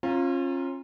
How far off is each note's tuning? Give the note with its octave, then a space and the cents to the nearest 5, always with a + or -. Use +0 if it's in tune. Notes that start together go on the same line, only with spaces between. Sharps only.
C#4 -35 F4 +0 A#5 +0